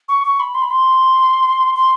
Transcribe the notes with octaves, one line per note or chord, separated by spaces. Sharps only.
C#6
C#6
B5
C6
B5
C6
C6